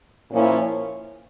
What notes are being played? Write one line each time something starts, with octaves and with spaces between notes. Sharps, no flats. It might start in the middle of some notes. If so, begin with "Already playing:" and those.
A#2 F3 A#3 C#4 E4